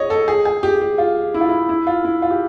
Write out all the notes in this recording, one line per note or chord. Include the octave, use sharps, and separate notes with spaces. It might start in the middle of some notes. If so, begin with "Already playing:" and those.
Already playing: C#5 D#5
A4
G#4
G#4
G4
G4
F4
E4
F4
E4
E4
F4
E4
F4
G4